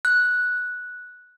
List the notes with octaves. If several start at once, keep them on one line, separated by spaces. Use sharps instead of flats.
F#6